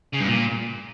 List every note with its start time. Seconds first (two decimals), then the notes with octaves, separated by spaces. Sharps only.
0.14 C#3
0.21 G2
0.27 A#2